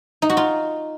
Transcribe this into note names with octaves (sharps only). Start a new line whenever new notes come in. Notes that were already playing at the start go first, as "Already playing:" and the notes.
D#4
F#4
F4